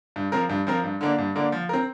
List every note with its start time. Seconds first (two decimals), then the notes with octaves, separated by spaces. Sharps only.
0.16 G2
0.32 F3 C4 A#4
0.49 G2
0.67 F3 C4 A#4
0.84 G2
1.01 D3 A#3 D4
1.18 G2
1.36 D3 A#3 D4
1.52 F3
1.69 C4 A#4